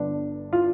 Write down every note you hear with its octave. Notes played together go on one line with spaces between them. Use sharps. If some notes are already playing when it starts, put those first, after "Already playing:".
Already playing: G1 G2 D3 D4
F4